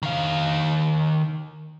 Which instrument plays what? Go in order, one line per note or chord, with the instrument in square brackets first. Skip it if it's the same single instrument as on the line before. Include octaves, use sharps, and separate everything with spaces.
[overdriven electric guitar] D#3 F5